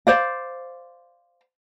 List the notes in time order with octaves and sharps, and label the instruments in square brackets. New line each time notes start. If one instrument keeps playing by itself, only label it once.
[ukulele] C5 D5 F5